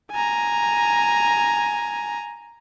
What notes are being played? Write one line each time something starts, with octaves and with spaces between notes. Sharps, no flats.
G#5 A#5